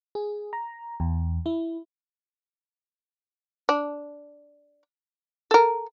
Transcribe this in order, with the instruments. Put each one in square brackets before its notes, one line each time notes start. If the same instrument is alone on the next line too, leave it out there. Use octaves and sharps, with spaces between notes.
[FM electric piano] G#4
A#5
E2
E4
[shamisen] D4
A4 A#4